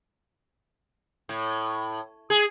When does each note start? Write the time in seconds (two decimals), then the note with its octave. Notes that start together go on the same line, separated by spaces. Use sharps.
1.29 A2
2.30 G#4